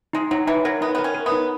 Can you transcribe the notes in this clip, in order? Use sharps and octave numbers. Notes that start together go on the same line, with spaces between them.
G#3 D#4
F#3 D#4
E3 D#4
F#3 A#4
B3 D#4
B3
A#4
C#4
A#4
B3
D#4